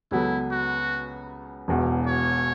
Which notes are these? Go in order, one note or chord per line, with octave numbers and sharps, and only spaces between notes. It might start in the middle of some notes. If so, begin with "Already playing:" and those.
C#2 C#3 F#3 B3 E4 A4
F#4
E1 E2 B2
C#5